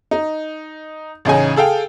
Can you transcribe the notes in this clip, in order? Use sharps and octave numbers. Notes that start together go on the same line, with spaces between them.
D#4
A1 C#3 D#4 G#5
G#4 A4 F5 G5